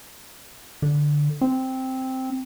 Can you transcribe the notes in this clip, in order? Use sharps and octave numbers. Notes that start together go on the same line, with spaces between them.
D3
C4